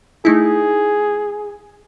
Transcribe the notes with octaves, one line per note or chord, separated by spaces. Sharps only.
A3 D#4 E4 G#4